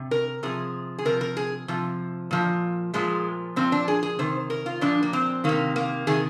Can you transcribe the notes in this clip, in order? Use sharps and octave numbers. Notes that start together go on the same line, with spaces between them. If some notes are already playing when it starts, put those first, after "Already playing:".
Already playing: C3
A#4
C3 F3 G#4
G#4
C3 F3 A#4
A#4
G#4
C3 F3
A#2 F3
A#2 F3 G#3
A#2 F3 C4
D4
G#4
G#4
C3 D#3 C5
A#4
F4
A#2 F3 D4
A#3
C4
C3 D#3 A#3
A#3
C3 D#3 G#4